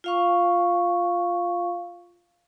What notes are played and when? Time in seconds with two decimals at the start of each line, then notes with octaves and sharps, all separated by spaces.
0.04 F4 F5 C#6